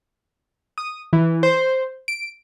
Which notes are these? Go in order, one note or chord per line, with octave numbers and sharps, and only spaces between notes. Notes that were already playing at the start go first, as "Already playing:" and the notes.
D#6
E3
C5
D7